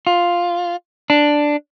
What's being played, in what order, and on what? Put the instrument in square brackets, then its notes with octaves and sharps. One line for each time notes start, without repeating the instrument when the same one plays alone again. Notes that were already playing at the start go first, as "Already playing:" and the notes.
[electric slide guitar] F4
D4